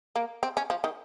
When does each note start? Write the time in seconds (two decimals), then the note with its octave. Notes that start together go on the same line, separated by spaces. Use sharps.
0.16 A#3
0.43 C4
0.57 C#4
0.70 F3
0.84 D#3